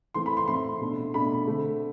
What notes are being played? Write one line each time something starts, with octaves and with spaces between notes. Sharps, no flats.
E3 A3 C4 C6
B5
C6
E3 A3 C4 C6
B2 A3 D4
B2 A3 D4 B5
D3 A3 C4